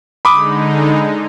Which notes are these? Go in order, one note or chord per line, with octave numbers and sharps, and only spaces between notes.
D3 G#3 D#4 B5 D6 D#6